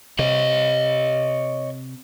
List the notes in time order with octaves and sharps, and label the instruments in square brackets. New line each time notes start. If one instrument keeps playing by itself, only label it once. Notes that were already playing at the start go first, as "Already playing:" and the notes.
[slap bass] C3 [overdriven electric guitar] C#5 D#5